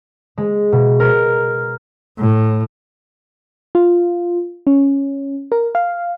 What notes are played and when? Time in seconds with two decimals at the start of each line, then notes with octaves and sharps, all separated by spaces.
0.38 G#3
0.72 B2
1.00 A#4
2.19 A2
3.75 F4
4.67 C#4
5.52 A#4
5.75 F5